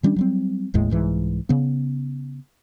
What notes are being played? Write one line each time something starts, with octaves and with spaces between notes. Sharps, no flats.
D#3 G3 C#4 D4
F#3 G3 C4
F#1 D#2 A2 G#3
C2 G#2 E3
C#3 B3